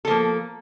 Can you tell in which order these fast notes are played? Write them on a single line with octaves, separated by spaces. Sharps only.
A4 F3 A#3